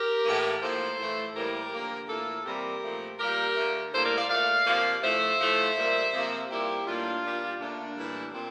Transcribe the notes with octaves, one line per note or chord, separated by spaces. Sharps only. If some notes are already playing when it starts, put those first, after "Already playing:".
Already playing: G4 A#4
A2 E3 A#3
A2 F3 A#3 A4 C5
A2 E3 A3
A2 E3 G3 A#3 G4 A#4
D3 F3 A#3
A2 E3 A#3 F4 A4
C3 E3 G3 A#3 G4 A#4
A#2 F3 A3
A#2 G3 A#3 G4 A#4
D3 A3
A2 G3 A#3 A4 C5
A#4 D5
D5 F5
A#2 A3 D5 F5
C3 F3 A#3
A2 F3 A3 C5 E5
A2 F3 A3
A#2 G3 A#3
C3 F3 A#3
A#2 G3 A#3 E4 G4
A2 G3 A#3 D4 F4
A#2 G3 A#3
D3 A3 A#3 D4
A2 E3 G3
A#2 C4